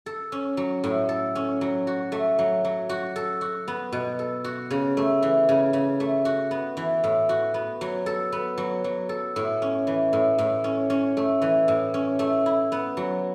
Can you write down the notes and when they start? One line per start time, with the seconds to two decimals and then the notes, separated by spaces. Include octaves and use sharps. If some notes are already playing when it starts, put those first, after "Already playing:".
0.06 A4
0.32 C#4
0.57 F#3
0.84 A2
1.09 A4
1.35 C#4
1.61 F#3
1.87 F#4
2.12 A3
2.39 F#3
2.65 F#3
2.89 F#4
3.16 A4
3.41 F#4
3.68 B3
3.92 B2
4.19 A4
4.44 F#4
4.70 C#3
4.97 A3
5.22 E3
5.49 C#3
5.73 C#3
6.00 A3
6.25 F#4
6.51 B3
6.77 E3
7.04 A2
7.29 F#4
7.54 B3
7.81 F#3
8.06 A4
8.32 B3
8.58 F#3
8.84 F#3
9.09 A4
9.36 A2
9.62 C#4
9.87 E3
10.13 A2
10.38 A2
10.64 C#4
10.90 C#4
11.17 A3
11.42 E3
11.68 A2
11.94 C#4
12.19 A3
12.46 E4
12.72 B3
12.97 F#3